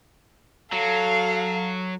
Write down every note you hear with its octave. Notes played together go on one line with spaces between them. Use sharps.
F#3 A4 F5